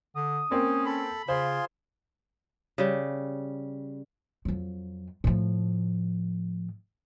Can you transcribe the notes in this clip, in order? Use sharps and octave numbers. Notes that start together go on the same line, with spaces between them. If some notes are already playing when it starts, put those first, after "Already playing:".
D3 D#6
A#3 C4 C#4
A4 B5
C#3 F4 G#4 C5 C6
C#3 G3
F2 F#3
A2 F3